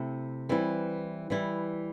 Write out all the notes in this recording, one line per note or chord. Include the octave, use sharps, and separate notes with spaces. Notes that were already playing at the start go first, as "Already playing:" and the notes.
Already playing: C3 A3 E4
E3 G3 C4 E4
E3 G3 E4